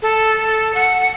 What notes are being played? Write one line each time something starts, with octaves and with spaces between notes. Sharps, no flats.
A4
F#5